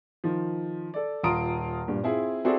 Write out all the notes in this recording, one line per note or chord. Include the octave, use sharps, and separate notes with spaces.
D#3 F3
A4 D5
D#1 F4 A#5 C6 D#6 D7
G2 A#2
C4 E4 F4 G#4
C4 E4 F#4 G#4 A4 D5